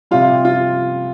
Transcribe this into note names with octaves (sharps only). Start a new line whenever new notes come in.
C3 G3 F4
F4